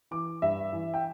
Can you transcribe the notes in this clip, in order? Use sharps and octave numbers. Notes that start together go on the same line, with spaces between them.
E3 D6
G2 E5
E3
G5